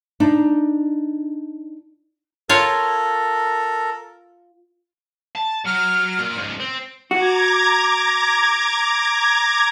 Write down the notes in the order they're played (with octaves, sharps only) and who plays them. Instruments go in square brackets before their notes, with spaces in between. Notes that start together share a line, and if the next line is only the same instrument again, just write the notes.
[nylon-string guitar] D4 D#4
[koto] F4 C#5 [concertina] A4 A#4
[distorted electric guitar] A5
[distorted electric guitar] F#3 [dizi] F6
[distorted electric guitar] A#2
C#2 G#2
C4
[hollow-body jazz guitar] F#4 [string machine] A#5 D6 G#6